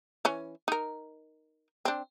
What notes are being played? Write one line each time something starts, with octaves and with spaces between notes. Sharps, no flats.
E3 C#4
D#4 A#4
C4 D4